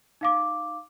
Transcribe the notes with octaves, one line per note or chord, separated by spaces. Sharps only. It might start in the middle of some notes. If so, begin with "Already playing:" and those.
D#4 F5 D6